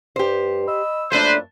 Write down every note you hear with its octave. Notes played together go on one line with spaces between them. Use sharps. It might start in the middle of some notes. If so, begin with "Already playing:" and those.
G2 G4 C5
D#5 B5 E6
F#2 F3 A3 A#3 D4 B4 C5